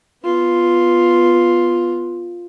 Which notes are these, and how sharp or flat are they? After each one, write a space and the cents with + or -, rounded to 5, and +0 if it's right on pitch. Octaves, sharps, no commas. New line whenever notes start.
B3 +0 F4 +0